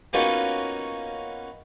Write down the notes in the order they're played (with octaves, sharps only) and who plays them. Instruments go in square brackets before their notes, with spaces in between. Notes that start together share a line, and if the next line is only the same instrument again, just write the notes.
[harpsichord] A#3 B3 C#4 D#4 F4 F#4